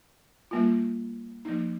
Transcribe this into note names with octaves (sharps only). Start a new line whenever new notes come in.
G3 A#3 F4
F3 A#3 D#4